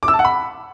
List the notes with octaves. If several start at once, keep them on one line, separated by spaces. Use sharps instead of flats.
D6
E6
A5
F#5
B5